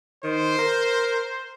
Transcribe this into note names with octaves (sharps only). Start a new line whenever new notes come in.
D#3 C5
A#4